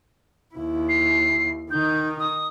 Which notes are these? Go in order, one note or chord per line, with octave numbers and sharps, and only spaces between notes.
D#2 E4
C7
D#3 D#4 G6
D#6